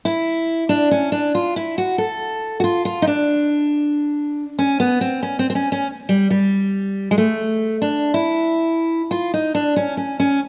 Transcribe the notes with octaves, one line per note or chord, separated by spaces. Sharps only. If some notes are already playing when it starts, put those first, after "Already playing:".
E4
D4
C#4
D4
F4
E4
F#4
A4
F#4
F4
F4
D#4
D4
C#4
B3
C4
C#4
C4
C4
C#4
C#4
G3
G3
G#3
A3
D4
E4
F4
D#4
D4
C#4
C#4
C#4